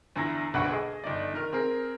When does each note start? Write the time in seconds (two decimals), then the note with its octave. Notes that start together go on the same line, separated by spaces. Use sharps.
0.16 E2 D3 E4 A#5 A#6
0.54 D#1 B1 D3 B4 F#5 C#6
0.71 G#4 A4 D#5
1.04 G1 D#4 D5
1.34 D#3 A#4 F6
1.53 C4 G#4 A#4